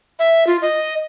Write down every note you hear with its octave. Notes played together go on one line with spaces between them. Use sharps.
E5
F4
D#5